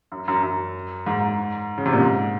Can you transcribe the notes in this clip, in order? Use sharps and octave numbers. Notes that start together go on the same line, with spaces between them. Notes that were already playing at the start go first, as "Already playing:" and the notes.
F#2
F#2
F#2
G#2
G#2
C#3
C3
A#2
G#2